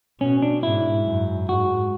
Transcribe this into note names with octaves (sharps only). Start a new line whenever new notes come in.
B2 C#4
D4
G#2 E4
F#2
G#2 F#4